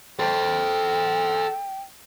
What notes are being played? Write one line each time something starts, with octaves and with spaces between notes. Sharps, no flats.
A4 C5 G5